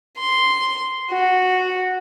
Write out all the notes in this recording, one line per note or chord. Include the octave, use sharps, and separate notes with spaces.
C6
F#4